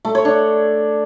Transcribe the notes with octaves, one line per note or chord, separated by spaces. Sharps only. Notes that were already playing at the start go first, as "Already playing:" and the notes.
A3
C#5
D4